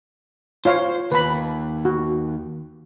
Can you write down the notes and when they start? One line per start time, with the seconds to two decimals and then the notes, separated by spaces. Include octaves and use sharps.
0.65 F4 C5 C#5 F5
1.12 D#2 B4 B5
1.85 F#4